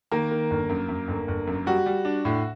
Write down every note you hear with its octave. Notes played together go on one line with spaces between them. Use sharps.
D#3 A#3 A#4
D#3
G1
F#2
F#2
G1
G1
F#2
G3 F#4
G3
D4
A2